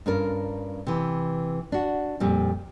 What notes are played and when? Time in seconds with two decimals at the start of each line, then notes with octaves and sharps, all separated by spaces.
0.06 G2 C#4 D4 F4 A#4
0.87 C3 E3
1.72 D4 F#4
2.20 F2 A#2 G3 C4